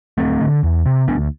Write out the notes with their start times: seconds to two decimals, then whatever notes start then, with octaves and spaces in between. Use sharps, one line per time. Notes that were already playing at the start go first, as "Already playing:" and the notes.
0.18 D2 A3 C4
0.41 D3
0.63 E2
0.86 C3
1.08 D2 B3 D4